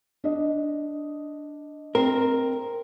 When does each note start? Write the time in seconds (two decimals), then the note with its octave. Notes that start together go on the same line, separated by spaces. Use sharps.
0.24 D4 D#5
1.95 C4 A#4